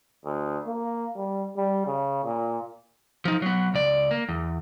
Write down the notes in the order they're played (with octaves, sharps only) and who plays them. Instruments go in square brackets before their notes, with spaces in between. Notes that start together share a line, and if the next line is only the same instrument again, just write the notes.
[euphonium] D2
A#3
G3
G3
C#3
A#2
[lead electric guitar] F3 D#4
F#3 B3
C#2 D5
A#3
E2